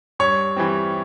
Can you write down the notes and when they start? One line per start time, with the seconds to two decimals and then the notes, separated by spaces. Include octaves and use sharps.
0.19 G2 C#5 C#6
0.57 E3 G3 C4